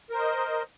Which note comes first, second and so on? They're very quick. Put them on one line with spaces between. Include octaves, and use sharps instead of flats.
A#4 C5 D#5